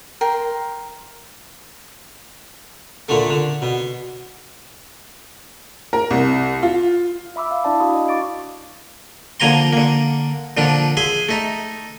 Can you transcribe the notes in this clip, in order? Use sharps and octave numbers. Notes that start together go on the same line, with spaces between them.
A#4 G5 C6
A#2 D3 A3
D3
B2
A#4
C2
F4
E5 B5 D6 E6
F5
D4 E4 D5 A5
D4 E4 F#4 F5 B5 D#6
D#5
C#6 D6 A6 D7
D3 F3 A#3 G#5 A#5 C6
D3 A#3
A#2 D3 F3 D4
G#4 E5 C6
A3 D#4